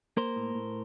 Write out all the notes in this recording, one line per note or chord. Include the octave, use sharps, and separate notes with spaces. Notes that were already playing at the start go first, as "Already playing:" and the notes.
A#3 A#4 C5
A2
A2